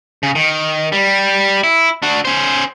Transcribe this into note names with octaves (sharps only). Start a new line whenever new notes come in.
C#3
D#3
G3
E4
D4 F#4
C#4 C5